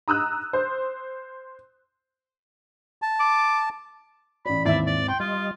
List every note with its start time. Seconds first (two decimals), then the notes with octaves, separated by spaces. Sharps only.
0.08 A#5 D#6 E6 F#6
0.53 C5
3.02 A5
3.20 D6
4.46 A1 D5 B5
4.65 D#2 G#2 C4 E4 D5 E5
4.87 D5
5.08 G5 C6
5.20 G3 F4 D#5